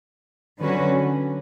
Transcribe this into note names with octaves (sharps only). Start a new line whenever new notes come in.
D3 F#3 C#4 F#4 B4